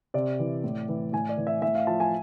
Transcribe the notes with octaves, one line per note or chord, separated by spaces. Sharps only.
C3 D5
E3
A2
E3
A2 G#5
D5
E3
E5
A2 E5
F5
F3 A5
G#5